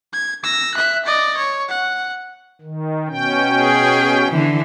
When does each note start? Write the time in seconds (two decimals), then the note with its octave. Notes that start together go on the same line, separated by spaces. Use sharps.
0.13 G#6
0.43 E6 A#6
0.74 E5 F#6
1.05 D5 D#5
1.37 C#5
1.68 F#5
2.61 D#3
3.08 B2 C#4 G5
3.61 G#4
4.29 D3 E3